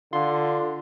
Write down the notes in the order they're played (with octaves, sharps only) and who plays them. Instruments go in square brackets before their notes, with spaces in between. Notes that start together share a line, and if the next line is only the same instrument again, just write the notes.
[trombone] D3 [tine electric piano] F4 C6